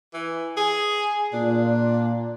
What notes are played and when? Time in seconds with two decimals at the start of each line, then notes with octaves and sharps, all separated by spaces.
0.14 E3
0.57 G#4
1.33 A#2 D4